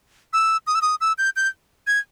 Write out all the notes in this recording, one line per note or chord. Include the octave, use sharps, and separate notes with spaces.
E6
D#6
E6
D#6
E6
G6
G6
G#6